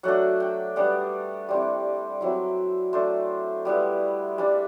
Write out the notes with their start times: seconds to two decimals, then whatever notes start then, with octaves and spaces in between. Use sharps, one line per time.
0.03 F#3 A3 D4 F#5
0.40 G5
0.76 G3 B3 D4 F#5
1.49 G3 C4 E4
2.21 F#3 C4 E4 E5
2.93 A3 D4 C5
3.65 G3 B3 E4
4.38 G3 D4